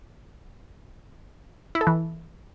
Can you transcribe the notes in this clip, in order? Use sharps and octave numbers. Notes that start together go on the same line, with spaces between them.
E4
A4
E3